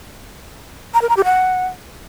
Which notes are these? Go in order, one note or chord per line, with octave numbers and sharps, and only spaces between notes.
A#5
A#4
A#5
G4
F#5